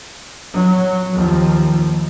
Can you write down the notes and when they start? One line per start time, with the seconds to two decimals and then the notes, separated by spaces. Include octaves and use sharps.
0.53 F#3
1.14 D#2 F3